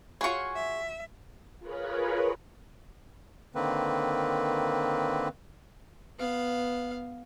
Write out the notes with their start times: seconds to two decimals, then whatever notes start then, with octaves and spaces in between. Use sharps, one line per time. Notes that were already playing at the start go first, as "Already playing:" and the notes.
0.21 F4 F#4 G#4 C#5 C#6
0.56 E5
1.59 F4 G#4 A#4 B4 C#5 B5
3.55 D3 D#3 A#3 C4 B4
6.19 B3 F5